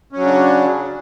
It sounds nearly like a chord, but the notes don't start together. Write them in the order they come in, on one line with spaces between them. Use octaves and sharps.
C#4 F#3 C#3 D4